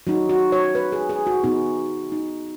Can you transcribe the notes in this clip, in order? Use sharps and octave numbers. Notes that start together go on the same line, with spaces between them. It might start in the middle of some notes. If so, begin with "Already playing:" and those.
F#3 D#4 F#4
F#4
C#5
B4
G#4
G#4
F#4
B2 B3 D#4 F#4
D#4